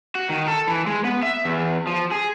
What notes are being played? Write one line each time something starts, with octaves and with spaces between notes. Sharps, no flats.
F#4
D#3
A4
E3
G#3
B3
E5
E2
F3
G#4